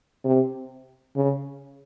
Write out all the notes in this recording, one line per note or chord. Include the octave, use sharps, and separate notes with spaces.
C3
C#3